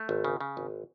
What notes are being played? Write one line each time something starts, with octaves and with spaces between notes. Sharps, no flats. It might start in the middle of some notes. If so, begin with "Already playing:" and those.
Already playing: A3
G#1
C#3
C#3
G#1